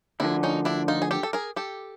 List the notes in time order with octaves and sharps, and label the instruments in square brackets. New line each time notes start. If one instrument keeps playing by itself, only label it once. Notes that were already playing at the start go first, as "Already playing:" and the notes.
[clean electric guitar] D2 D3 F3 [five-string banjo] D4 E4
[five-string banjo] C#4 D#4
D4 E4
D#4 F4
G#4
G4 A4
A4
G#4 A#4
G4 A4